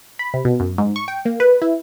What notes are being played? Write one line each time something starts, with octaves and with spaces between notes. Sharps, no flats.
B5
C3
B2
F#2
G#2
C#6
G5
A#3
B4
E4